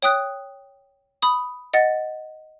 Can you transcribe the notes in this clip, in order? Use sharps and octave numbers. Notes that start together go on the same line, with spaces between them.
C#5 G5 D#6 F#6
B5 D#6
D#5 F#5 A6